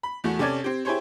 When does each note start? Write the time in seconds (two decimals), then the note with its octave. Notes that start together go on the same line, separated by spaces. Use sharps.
0.03 B5
0.24 E2 A3 F#4
0.39 C3 C#4 A4 D5 G#6
0.64 C4 G4
0.85 E4 G4 G#4 C5 C#5